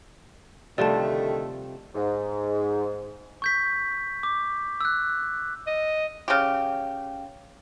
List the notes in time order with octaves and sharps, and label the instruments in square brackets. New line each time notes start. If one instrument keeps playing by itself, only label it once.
[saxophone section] D2 D#3 A3 [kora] C3 F3 G3 [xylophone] D5 A5
[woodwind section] G#2
[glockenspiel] C#6 G6 B6
D6
E6 F#6
[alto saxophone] D#5
[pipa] C#3 G4